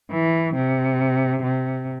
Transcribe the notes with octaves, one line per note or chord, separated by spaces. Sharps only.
E3
C3
C3